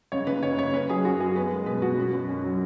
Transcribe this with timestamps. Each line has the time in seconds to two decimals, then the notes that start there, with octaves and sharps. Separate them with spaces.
0.12 C#3 C#5
0.27 F#1 B4
0.43 F#1 C#5
0.58 C#3 C#5
0.73 C#4 B4
0.89 F#3 G#4
1.04 F#2 F#4
1.20 F#3 G#4
1.36 B3 B4
1.51 G#3
1.66 B2 B4
1.82 B2 F#4
1.98 F#2
2.13 F#2
2.29 C#4
2.44 F#3